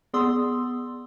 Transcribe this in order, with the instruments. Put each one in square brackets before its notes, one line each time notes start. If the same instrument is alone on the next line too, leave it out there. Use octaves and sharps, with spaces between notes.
[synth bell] B3 G#4 D5 C6 D#6 E6